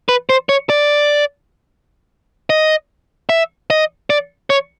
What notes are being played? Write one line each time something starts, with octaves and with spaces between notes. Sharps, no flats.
B4
C5
C#5
D5
D#5
E5
D#5
D5
C#5